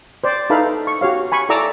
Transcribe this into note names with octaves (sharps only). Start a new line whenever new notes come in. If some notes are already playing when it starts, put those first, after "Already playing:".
C5 D5
D#4 E4 A4 B4 F5 B5
C#6
F#4 G4 C#5 F5
G#5 B5 C#6
E4 A4 D5 A#5 D6 E6